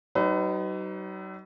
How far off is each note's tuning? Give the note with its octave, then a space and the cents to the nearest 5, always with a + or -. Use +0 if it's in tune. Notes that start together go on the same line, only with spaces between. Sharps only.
F#3 +45 D#4 +0 B4 +35